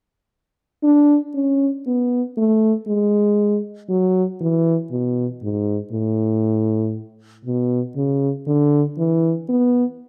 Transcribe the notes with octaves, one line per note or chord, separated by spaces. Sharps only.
D4
C#4
B3
A3
G#3
F#3
E3
B2
G#2
A2
B2
C#3
D3
E3
B3